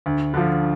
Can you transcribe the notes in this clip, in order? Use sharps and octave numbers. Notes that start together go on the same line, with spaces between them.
D2
D3 F3